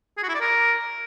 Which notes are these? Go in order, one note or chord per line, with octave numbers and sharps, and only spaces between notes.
G#4
F#4
E4
D5
A#4